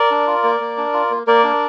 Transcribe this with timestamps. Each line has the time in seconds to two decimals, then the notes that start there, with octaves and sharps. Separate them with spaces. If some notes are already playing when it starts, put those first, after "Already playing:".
Already playing: A#4 D5
0.11 D4
0.27 F4
0.44 A#3
0.60 A#3
0.77 D4
0.94 F4
1.10 A#3
1.27 A#3 A#4 D5
1.44 D4